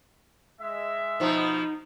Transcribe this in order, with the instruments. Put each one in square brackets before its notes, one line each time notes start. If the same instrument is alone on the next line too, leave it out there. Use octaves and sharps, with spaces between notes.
[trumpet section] G#3 E5
[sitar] B2 F3 B3 [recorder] D#4